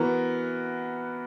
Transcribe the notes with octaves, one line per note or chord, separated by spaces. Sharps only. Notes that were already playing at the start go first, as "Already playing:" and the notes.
Already playing: E3 B3 F#4 A#4